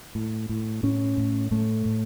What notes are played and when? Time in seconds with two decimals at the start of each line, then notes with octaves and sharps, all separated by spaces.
0.15 A2
0.49 A2
0.83 A2 C#4
1.17 A2
1.51 A2 A3
1.86 A2